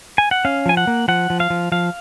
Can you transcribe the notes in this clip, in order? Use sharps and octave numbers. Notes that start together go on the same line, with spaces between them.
G#5
F#5
C#4 F5
F3 G#5
F#5
A#3
F3 F#5
F3
F5
F3
F3 F5